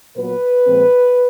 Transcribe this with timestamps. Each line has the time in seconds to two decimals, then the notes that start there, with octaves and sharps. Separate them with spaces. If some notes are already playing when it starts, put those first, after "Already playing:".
0.17 A#2 F#3 B3 B4
0.66 A#2 F3 G#3 C4